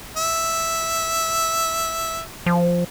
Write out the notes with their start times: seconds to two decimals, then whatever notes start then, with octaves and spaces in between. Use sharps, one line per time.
0.17 E5
2.46 F3